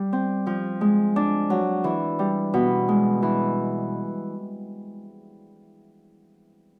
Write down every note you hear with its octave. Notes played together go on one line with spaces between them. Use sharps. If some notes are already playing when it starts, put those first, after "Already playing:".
Already playing: G3
C4
F3
G#3
D4
F#3
E3
G3
B2
G#3
E3